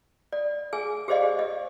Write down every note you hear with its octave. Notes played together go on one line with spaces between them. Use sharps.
D5
G#4 G#5
G4 G#4 C5 D5 D#5 F5
D#5